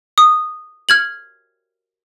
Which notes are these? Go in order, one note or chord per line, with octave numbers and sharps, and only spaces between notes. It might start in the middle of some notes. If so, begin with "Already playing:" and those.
D#6
F6 G#6 F#7